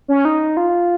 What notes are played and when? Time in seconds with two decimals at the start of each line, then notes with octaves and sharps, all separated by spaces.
0.08 C#4
0.25 D#4
0.57 F4